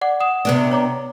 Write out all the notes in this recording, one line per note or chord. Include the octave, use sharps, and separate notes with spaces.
D5 F#5 D6
F#5 D#6 E7
C3 B3 D4
C#5 A#5 D6